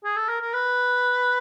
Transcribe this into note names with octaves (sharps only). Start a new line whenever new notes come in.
G#4
A4
A#4
A#4
B4